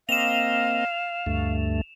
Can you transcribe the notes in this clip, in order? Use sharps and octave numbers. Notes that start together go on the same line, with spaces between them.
A#3 C4 D#5 F5 E7 F7
D2 G2 A3